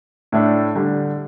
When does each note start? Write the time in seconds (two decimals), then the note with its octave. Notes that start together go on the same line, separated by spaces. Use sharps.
0.32 A2 A3 D4
0.75 D3 G3 D4